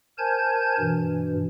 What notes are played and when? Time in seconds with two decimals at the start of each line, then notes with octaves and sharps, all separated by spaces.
0.18 A#4 C5 G#5 A5 G6 G#6
0.79 G2 B2 E3